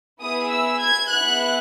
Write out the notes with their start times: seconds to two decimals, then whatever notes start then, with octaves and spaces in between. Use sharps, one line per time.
0.22 B3 E4 G#4 D#6
0.52 E6
0.81 G#6
1.10 B3 E4 G#4 F#6